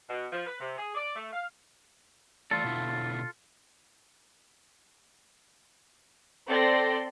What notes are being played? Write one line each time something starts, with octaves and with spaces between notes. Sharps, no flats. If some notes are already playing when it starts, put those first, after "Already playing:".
B2
F3
B4
C3
G#4
D5
A3
F5
E3 A3 F4 A4 D5
B2 D3 E4
C4 A4 D5 G5 C6 A#6